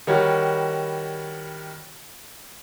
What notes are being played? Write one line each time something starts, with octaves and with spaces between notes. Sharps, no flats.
D#3 G3 F#4 C#5